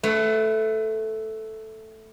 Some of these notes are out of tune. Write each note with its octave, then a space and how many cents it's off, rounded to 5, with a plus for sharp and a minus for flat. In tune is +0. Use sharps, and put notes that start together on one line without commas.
A3 +0 B4 +30 F#5 +0